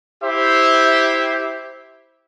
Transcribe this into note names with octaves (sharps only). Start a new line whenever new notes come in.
E4 G4 C5 E5